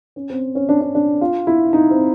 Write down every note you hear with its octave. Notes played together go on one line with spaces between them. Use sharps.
C#4
C4
C#4
D4
D4
D4
F4
E4
D#4
C4